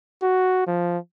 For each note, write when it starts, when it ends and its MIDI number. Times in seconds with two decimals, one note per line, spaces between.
0.22 0.63 66
0.67 0.98 53